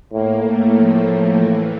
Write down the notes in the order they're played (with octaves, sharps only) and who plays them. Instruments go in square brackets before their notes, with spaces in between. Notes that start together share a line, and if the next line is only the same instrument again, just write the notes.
[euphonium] A2 [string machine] A#3
[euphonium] A2 [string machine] A3
[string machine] F3
E3